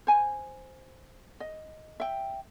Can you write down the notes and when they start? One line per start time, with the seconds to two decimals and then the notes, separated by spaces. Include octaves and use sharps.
0.07 C5 G#5
1.40 D#5
2.00 E5 G5